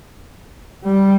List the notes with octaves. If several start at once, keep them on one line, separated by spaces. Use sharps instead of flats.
G3